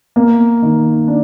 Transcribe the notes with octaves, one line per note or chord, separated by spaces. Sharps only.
A#3
D#3
D4